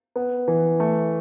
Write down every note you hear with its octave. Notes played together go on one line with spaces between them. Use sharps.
B3
E3
A3